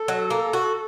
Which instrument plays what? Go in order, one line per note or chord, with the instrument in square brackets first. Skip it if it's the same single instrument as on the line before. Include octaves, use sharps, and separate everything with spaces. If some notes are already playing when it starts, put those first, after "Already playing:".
Already playing: [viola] A4
[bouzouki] F#3
A#3
F#4